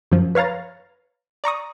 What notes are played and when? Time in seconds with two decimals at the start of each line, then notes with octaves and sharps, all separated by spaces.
0.12 F#2 F3
0.35 B4 C#5 F5 A#5 A6
1.44 D5 A#5 C#6 D#6